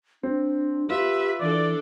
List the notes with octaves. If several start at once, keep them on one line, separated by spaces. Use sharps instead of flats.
C4 D4
F4 G4 B4 E5
E3 D4 A4 D5